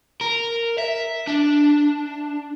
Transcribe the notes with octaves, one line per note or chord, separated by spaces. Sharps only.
A#4
E5
D4